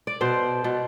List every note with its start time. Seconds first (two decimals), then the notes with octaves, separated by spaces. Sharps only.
0.07 D5
0.21 B2 C5
0.64 B2